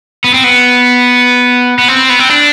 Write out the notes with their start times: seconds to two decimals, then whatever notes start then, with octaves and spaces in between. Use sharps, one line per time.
0.24 B3
0.34 C4
0.44 B3
1.79 B3
1.88 C4
2.09 B3
2.19 C4
2.29 D4